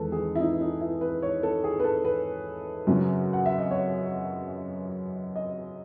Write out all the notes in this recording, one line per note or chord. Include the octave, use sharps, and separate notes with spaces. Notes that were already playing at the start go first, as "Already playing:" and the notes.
Already playing: E2 D#3 G#3 D#4 A4 B4
G#4
E4
D#4
D#4
E4
B4
C#5
A4
G#4
B4
A4
B4
F#2 C#3 F#3 C#4
F#5
E5
D#5
C#5
D#5